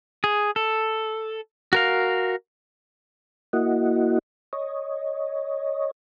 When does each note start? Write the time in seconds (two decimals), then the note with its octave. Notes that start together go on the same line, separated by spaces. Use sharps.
0.24 G#4
0.56 A4
1.73 F#4 A#4 F5
3.53 A#3 E4 F#4 D#5 F#5
4.53 C#5 D#5